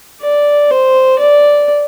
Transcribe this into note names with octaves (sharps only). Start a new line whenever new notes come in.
D5
C5
D5